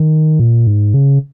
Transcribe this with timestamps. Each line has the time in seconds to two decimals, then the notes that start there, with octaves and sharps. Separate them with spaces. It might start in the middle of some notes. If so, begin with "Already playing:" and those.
Already playing: D#3
0.39 A#2
0.67 G#2
0.94 C#3